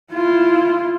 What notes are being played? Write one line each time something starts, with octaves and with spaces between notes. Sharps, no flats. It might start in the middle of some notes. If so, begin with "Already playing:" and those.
E4 F4